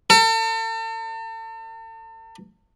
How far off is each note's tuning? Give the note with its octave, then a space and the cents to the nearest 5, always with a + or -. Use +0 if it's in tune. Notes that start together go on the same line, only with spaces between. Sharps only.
A4 +40